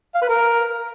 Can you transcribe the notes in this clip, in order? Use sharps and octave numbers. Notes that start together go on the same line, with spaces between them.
F5
B4
A#4